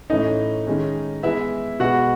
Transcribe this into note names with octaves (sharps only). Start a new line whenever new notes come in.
A2 E3 A3 C#4 D#4 D#5
D#3 G#3 C#4
E3 G#3 B3 E4 E5
B2 G#3 B3 F#4 F#5